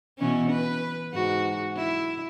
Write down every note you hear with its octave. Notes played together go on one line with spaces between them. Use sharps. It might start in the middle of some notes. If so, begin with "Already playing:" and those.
B2 E3 C#4
B4
G#2 F#4
E4